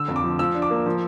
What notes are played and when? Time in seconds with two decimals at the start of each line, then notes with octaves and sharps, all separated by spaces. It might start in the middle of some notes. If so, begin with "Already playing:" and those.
Already playing: D3 E6
0.08 F2
0.16 D6
0.24 F3
0.39 F3 E6
0.54 D4
0.62 D6
0.70 A#3
0.86 F3